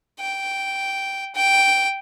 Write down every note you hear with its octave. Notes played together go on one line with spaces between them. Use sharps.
G5
G5